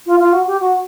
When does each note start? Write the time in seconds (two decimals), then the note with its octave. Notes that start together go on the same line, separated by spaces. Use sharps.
0.06 F4
0.19 F4
0.32 F#4
0.47 G4
0.60 F#4